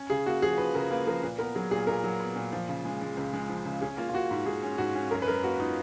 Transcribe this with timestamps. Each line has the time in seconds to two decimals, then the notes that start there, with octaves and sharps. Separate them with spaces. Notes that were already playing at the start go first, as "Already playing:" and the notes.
Already playing: C#4
0.10 C#3 G#4
0.26 A#3 F#4
0.42 F3 G#4
0.58 F3 B4
0.75 C#3 A#4
0.91 A#3 B4
1.07 F3 A#4
1.23 A#2 B4
1.38 B3 A#4
1.55 F#3 G#4
1.71 A#2 G#4
1.87 A#2 A#4
2.04 F#3
2.20 B3
2.36 A#2
2.53 F3
2.69 C#3
2.85 G#3
3.01 G#3
3.17 C#2
3.33 G#3
3.49 F3
3.65 C#3
3.81 C#4 G#4
3.97 A#3 F4
4.09 F4
4.13 A#3 F#4
4.31 G#2
4.46 G#2 G#4
4.63 C#4
4.78 G#2 F#4
4.95 C#4
5.11 F#2 A#4
5.22 B4
5.27 F#2 A#4
5.44 A#3 F#4
5.60 D#4 F4